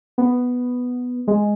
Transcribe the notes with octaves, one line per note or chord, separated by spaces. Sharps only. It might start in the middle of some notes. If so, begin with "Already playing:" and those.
B3
G#3